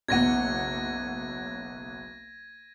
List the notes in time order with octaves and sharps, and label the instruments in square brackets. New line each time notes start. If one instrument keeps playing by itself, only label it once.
[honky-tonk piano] F#1 B1 F#5 [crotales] G#6 A#6 D#7